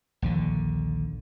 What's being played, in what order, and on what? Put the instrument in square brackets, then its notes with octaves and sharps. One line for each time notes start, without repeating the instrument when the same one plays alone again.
[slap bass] A#1 D#2 D3